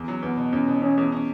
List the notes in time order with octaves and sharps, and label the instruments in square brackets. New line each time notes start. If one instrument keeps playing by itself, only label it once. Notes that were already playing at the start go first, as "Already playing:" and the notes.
Already playing: [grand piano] E2
F#3
[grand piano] E2 [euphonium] B3
[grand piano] B2
[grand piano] E2 [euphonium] C#4
[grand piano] B2
[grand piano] E2 [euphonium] C#4
[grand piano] E2
C#4